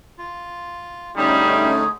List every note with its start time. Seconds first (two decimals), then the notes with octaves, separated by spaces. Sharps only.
0.18 F4
1.16 D3 G3 A3 C#4 D#4 G#4